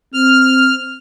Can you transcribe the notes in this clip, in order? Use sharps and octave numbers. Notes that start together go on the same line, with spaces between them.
C4 F6